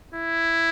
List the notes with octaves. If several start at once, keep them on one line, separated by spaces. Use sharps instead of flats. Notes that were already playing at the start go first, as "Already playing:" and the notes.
E4